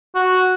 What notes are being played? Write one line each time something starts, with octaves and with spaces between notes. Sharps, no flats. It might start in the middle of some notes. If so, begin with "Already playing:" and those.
F#4